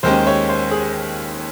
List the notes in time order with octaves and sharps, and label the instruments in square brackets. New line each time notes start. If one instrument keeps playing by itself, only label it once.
[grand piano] D#2 D#3 G#3 C#4 G4 [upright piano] C5
[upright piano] C#5
C5
G#4